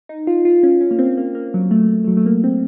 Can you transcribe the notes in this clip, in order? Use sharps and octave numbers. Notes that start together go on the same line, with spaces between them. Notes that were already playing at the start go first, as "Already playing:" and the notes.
D#4
F4
F4
C#4
C#4
A#3
C4
A#3
A#3
F#3
A3
A3
F#3
A3
A#3
C4